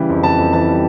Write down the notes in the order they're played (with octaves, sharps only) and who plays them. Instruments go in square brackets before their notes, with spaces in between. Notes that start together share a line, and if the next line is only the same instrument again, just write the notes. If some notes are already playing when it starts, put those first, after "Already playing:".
Already playing: [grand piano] C#3 E3 G3
F2
E3 A5
F2
E3 A5
G3